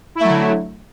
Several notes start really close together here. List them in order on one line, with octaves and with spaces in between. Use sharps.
E4 A3 F#3 D3